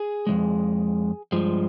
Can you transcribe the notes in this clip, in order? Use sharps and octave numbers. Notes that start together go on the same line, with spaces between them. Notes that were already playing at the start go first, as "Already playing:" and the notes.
Already playing: G#4
F2 C#3 G#3
G2 F3 G#3